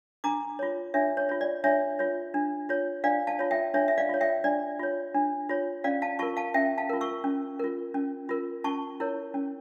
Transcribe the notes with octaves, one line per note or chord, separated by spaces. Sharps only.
D4 A#5 D6
F4 C#5
D4 C#5 E5
C#5
F4 C#5
D5
D4 C#5 E5
F4 C#5
D4
F4 C#5
D4 D5 F5
F5 A5
F4 C#5
E5 G5
D4 C#5 E5
E5
D5 F5
F4 C#5
E5 G5
D4 D5
F4 C#5
D4
F4 C#5
C#4 D5 F5
F5 A5
F4 A#4 A5 C#6
F5 A5
C#4 E5 G5
F5 A5
F4 A#4
C#6 E6
C#4
F4 A#4
C#4
F4 A#4
C#4 A5 C#6
E4 A#4 C#5
C#4